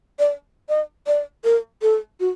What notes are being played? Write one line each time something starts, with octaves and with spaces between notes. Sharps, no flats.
D5
D#5
D5
A#4
A4
F#4